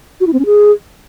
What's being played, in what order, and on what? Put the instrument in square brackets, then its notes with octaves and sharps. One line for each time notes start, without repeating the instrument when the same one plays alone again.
[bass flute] F#4
E4
C4
C#4
G#4